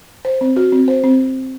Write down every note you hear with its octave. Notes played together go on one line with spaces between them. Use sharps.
C5
C4
F#4
C4
C5
C4